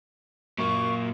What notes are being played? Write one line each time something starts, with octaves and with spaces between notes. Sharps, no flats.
F#2 A#2 A#3 C#6